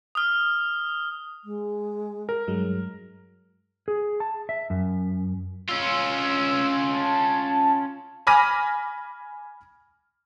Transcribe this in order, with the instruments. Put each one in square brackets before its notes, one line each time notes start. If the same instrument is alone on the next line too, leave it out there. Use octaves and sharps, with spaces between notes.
[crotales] D#6 F6
[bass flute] G#3
[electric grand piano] A#4
[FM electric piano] G2 F#3 G#3
[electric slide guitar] G#4
A5
E5
F#2
[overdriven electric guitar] C#4 F4 [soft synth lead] E6
[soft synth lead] A5
[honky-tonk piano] G#5 B5 D6 F6 A#6 D#7